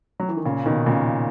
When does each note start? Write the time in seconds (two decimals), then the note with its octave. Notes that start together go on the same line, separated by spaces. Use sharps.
0.20 F#3
0.29 E3
0.37 D#3
0.45 A#2 C#3
0.66 B2 D#3
0.86 A#2 C#3